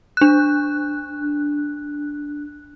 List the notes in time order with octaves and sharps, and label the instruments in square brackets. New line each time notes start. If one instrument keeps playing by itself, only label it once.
[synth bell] D4 F#6